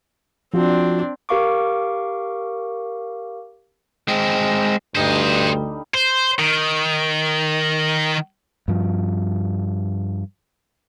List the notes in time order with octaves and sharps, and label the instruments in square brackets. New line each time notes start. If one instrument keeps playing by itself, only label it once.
[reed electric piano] F3 F4 F#4 [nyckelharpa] C4 D4
[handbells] G4 A#4 F5 C#6 D6
[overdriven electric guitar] G#3 C4
[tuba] D2 [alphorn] G2 [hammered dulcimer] D3 G3 D#4 [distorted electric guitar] C5 D#5
[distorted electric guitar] C5
D#3
[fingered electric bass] G2 F3